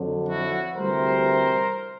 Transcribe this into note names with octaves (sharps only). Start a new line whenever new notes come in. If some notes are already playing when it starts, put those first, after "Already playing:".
Already playing: F2 D3 F#3
E4 F#4
D2 C3 E3 G3 A#4 C5